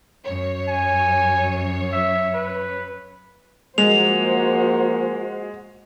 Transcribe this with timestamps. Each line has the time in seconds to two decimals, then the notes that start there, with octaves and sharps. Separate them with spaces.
0.24 F#2 C#5
0.69 G#5
1.92 E5
2.35 B4
3.78 F3 G#3 A#3 F#4 C5 F7